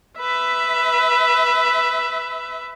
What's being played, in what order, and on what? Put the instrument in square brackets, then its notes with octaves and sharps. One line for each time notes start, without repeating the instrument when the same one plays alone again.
[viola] B4 E5